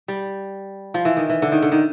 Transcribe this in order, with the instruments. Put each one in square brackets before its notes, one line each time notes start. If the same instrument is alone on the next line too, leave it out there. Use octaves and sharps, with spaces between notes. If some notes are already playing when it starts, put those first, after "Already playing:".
[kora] G3
F3
E3
D#3
E3
D3
D#3
D3
D#3